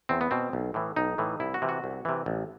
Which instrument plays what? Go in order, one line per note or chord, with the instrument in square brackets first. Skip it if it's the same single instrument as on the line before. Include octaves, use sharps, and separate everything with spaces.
[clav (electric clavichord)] E2 C4
B3
B2 C4
B1
A2 E3
B1 D#4
A2 E3
C2 E4
F#4
C3 E3
F#4
C2
C3 E3
A1